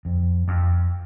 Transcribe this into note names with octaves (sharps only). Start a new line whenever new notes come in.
F2
F2